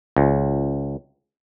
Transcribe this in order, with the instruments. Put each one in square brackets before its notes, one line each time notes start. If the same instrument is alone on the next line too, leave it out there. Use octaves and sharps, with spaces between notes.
[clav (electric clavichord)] C#2